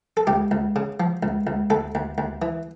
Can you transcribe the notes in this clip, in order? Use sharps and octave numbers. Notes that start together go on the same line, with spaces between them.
A4
C#2 G4
C#2
C#3
F3
C#2
C#2
D2 A4
D2
D2
E3